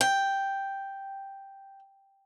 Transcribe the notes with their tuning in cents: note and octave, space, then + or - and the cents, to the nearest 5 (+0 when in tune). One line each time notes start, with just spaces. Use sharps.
G5 +0